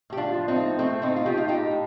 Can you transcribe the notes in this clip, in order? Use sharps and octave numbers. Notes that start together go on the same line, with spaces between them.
A2 G4
D4 F4
F3
C4 D#4
A3
A2 A3 C4
A3 C4 D#4
F4
A3 D#4 G4
F4
A2 D#4 G4
A2